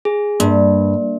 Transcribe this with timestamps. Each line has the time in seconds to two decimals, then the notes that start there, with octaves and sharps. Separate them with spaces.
0.05 G#4
0.40 G2 A#3